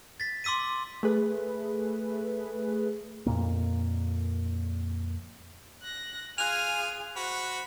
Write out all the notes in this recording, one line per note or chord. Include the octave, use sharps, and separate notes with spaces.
A6 B6
C6 D6 E6 B6 D#7
A3 G#4 B4
F2 A#2 A#3
F#6 A#6
F4 G#4 G#5 F6 F#6 F7
F#4 C5 B5